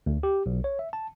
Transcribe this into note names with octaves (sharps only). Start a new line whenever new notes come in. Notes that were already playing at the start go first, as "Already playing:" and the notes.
D2
G4
B1
C#5
E5
A5